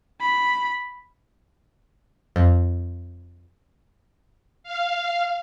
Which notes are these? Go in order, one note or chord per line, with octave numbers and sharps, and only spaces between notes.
B5
F2
F5